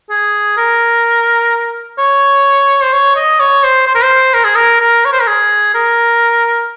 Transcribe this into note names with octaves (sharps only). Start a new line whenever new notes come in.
G#4
A#4
C#5
C5
C#5
D#5
C#5
C5
C5
A#4
C5
A#4
G#4
A#4
A#4
C#5
C5
A#4
G#4
A#4